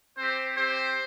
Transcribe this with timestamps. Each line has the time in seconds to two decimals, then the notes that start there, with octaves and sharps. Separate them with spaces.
0.17 C4 G4 C5
0.56 C4 G4 C5